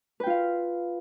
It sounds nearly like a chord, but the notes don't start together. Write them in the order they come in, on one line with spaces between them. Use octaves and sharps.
B4 G5 F4 F5